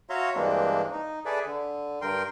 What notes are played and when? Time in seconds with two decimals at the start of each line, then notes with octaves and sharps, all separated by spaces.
0.10 F#4 C#5 E5 F5 A#5 C6
0.36 G2 E3 G#3 A#3 C4 D4
0.92 D#4
1.26 G#4 A4 B4 D5 E5
1.46 D3
2.02 G2 A#4 G5 C6